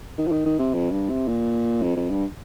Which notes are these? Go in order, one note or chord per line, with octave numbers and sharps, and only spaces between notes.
D#3
F3
D#3
D#3
C3
F2
G2
C3
A#2
F2
F2
G2